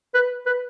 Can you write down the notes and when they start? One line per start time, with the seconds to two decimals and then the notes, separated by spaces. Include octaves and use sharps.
0.14 B4
0.46 B4